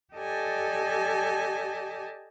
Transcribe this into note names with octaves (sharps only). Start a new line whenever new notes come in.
G4 A4 D5 D#5 G#5 A5